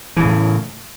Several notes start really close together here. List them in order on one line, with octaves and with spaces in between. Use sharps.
E3 C#3 A2